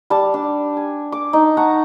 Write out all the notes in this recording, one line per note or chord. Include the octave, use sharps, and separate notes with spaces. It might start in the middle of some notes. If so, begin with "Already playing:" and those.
G3 A5
D4
G#5
D6
D#4
F#5 A5 A#5 C#6